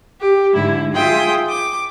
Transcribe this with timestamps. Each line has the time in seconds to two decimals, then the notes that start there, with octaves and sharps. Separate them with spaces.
0.21 G4
0.54 G#2 D3 E4
0.95 F4 G#4 E5 G5 D#6
1.49 D6